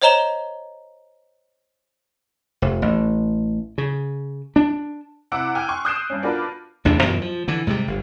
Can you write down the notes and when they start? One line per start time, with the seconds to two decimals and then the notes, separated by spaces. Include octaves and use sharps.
0.02 C5 C#5 D#5 A#5 E7 G7
2.62 F1
2.82 A1
3.78 C#3
4.56 D4
5.32 C3 E4 F#5 D6 E6 D7
5.55 G5 G#5 D6 F6 F#6
5.69 C6 C#6
5.85 D#6 F#6 G6 C7 D7 E7
6.10 G2 C#4
6.22 B3 D4 F4 F#4 A#4 B4
6.85 A1 E2 C3 D4
7.02 F#2 B2 E3 F3
7.21 F3
7.48 D3 E3
7.67 G#2 C3 D#3 G3
7.87 G1